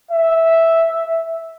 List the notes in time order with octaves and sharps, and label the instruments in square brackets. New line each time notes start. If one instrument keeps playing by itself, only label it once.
[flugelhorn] E5